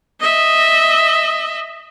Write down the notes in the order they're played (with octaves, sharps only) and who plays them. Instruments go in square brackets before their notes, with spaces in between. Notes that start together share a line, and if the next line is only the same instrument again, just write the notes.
[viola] D#5 E5